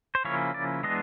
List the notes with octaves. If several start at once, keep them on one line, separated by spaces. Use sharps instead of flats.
C5
C#3 F3 A#3 C#4 E4 C#5
D5
E3 G#3 B3 D4 D#5